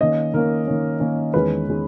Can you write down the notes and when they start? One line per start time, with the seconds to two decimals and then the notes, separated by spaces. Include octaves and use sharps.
0.01 D#3 A#3 C#4 D#5
0.34 D#3 A#3 C#4 A#4
0.67 D#3 A#3 C#4
1.00 D#3 A#3 C#4
1.34 E2 D#3 G#3 C#4 B4
1.69 D#3 G#3 C#4